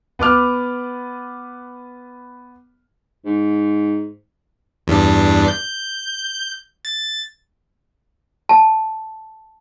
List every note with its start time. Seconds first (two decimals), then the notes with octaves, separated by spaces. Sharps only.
0.19 B3 B4 D6 F6
3.25 G#2
4.87 E2 G2 D4
5.48 G6
6.85 A6
8.49 A5